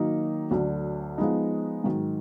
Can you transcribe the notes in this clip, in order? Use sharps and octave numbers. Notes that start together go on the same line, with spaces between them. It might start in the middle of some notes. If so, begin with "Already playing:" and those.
Already playing: D#3 F#3 A#3 D#4
D2 D3 F#3
F3 G#3 B3 D#4
G#2 D#3 F#3